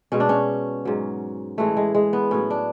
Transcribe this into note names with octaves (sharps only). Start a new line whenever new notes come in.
B2 G#3 C#4
D4
C#4
G#2 F#3
A2 E3 G#3 A3
G#3
G#3
B3
A2 F#3 C#4
D4